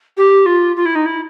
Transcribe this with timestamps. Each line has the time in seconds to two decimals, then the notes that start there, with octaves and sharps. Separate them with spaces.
0.17 G4
0.46 F4
0.76 F4
0.86 E4
0.95 D#4
1.06 E4